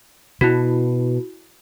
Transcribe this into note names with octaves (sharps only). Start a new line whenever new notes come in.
B2 E4 F#4